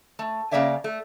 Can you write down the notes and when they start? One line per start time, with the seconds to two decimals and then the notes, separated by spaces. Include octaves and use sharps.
0.19 A3
0.51 C#3 A#3 C#5 D5 E5 G#5
0.84 A3